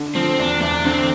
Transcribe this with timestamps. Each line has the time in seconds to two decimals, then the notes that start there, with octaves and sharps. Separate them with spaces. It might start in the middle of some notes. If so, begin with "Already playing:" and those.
Already playing: D3
0.15 F3 C4
0.38 E2 D4
0.61 E2 D4
0.84 D3 C4